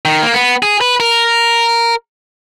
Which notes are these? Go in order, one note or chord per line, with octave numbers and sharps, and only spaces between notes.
D#3
A#3
B3
G#4
B4
A#4